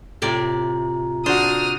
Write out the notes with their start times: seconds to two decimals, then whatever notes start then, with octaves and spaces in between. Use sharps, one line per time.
0.22 A2 C3 F4 D5 A#5
1.26 D4 F#4 C5 D#6 F6